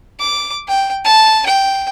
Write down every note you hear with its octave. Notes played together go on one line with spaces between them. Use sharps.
D6
G5
A5
G5